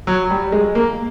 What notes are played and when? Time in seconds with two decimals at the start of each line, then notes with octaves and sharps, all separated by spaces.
0.07 F#3
0.30 G3
0.52 G#3
0.75 A#3